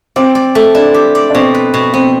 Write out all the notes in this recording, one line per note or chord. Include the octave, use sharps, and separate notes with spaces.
C4 D5
D5
A3
D4 E4
G4
D5
D4
B2 C4
B4
B2
B3 C4